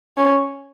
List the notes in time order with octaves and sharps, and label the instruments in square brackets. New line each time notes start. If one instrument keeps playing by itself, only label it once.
[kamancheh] C#4